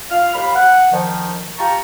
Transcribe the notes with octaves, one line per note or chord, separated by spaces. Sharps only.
F4 F5 F6
D#2 F5 B5
F#5
D#3 F3
F4 G4 A5 A#5 C#6